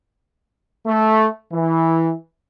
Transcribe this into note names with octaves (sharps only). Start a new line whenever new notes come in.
A3
E3